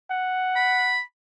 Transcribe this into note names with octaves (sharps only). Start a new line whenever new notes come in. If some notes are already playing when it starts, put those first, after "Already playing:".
F#5
B5